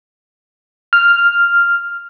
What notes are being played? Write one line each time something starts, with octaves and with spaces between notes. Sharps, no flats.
F6